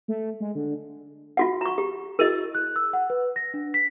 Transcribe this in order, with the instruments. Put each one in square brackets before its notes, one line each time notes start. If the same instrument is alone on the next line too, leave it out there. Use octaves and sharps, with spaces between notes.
[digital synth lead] A3
G#3
D3
[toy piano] F4 F#4 F#5
A#5 C#6
G4
[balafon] E4 F#4 G#4 [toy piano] A#4 D#5
[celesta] F#6
E6
F#5
B4
A#6
D4
B6